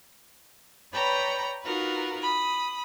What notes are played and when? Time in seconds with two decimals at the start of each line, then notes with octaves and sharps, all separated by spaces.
0.94 B4 C#5 D5 G5 A#5 B5
1.62 D#4 F4 F#4 A#4 B4
2.22 B5 D#6